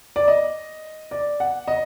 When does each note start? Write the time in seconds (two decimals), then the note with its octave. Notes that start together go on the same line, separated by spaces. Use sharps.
0.16 D5
0.28 D#5
1.11 D5
1.40 F#5
1.68 D#5